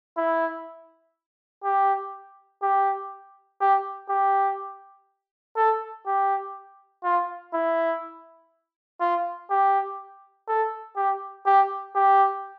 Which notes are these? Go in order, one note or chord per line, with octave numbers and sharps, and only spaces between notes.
E4
G4
G4
G4
G4
A4
G4
F4
E4
F4
G4
A4
G4
G4
G4